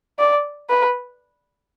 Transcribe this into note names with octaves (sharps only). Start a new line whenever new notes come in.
D5
B4